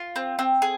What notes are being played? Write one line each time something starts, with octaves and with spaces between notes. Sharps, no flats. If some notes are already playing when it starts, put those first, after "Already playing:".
Already playing: F4
C4
C4
G#4